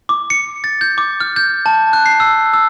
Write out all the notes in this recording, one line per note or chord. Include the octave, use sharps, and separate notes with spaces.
D6
C#7
A6
G6
D6
F6
G6
A5
F#6
C7
E6
E6